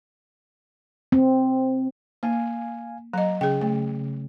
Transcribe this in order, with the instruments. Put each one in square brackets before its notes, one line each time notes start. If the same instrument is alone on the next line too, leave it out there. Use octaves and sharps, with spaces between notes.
[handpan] C4
[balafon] A#3 [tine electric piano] F5 G#5
[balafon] F#3 D#5 [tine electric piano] A#5
[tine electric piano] C#3 [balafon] G#4 G5
[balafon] A3